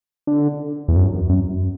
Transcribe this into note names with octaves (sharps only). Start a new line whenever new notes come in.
D3
E2
F#2
F#2